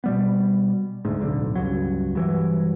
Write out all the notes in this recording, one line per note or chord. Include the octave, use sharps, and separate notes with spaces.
B2 G3 B3
D2 G#2
D1 B1 D3
C#2 G2 F#3
G2 E3 F#3